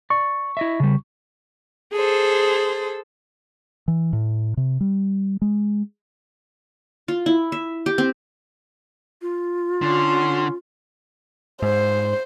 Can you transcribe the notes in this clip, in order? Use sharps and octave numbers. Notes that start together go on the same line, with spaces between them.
D5 C#6
E4 D#5 E5
C#3 G3
G#4 A4 C5
E3
A2
C3
G3
G#3
F4
E4
E5
G4
C4
F4
D3 C#4 C6
G#2 C5